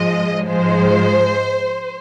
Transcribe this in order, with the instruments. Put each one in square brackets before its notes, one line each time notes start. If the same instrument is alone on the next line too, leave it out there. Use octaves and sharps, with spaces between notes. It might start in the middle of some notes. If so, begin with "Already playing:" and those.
Already playing: [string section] G#2 F3 G#3 D#5
G#2 F3 G#3 C5